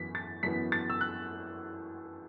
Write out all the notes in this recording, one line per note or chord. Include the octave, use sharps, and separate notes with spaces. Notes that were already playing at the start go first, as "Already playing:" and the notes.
Already playing: F#2 E3 B3 B6
A6
F#2 E3 B3 B6
A6
E6
F#6